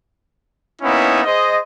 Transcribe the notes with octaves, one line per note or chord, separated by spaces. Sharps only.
A#3 B3 C#4 D#4 E4
G#4 C5 D#5